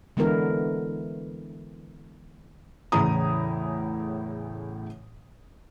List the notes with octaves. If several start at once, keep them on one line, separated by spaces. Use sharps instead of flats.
D3 E3 G#3 B3 E4 A#4
E2 A2 C#3 E4 A#5 D#6